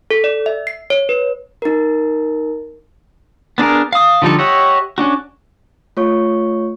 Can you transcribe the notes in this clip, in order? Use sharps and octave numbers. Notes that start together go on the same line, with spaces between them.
A4
D5
E5
C7
C#5
B4
D#4 A#4
B3 D4 G#4 A#4
F5 D#6
D3 F3 G3 D#4 A4
G4 C#5 D#5 E5 F#5
C#4 D4 F#4
A3 F4 C#5 C#6